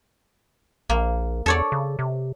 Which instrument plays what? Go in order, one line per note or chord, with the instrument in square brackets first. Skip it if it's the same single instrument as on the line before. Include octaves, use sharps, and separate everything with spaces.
[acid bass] A#1 [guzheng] A#3
[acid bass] E2 [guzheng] A4 C#5 D5
[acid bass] C#3
C3